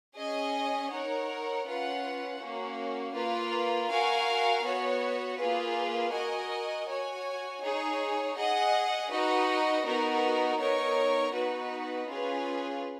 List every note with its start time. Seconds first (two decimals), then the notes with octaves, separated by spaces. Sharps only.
0.16 C#4 G#4 D#5 G#5
0.92 D#4 A#4 C#5 F#5
1.66 C#4 F4 B4 F#5
2.40 A#3 C#4 F#4
3.15 A#3 F4 B4
3.89 F#4 A#4 F5 G#5
4.64 B3 F#4 C#5
5.38 A#3 F4 G#4 B4
6.12 F#4 A#4 D#5 G#5
6.87 F#4 C#5 G#5
7.61 D#4 G#4 C#5
8.36 G#4 D#5 F#5
9.10 D#4 F#4 B4 D#5
9.85 B3 D#4 F#4 A#4
10.59 B3 D#4 A#4 C#5
11.34 B3 D#4 F#4 B4
12.08 C#4 F4 G#4 B4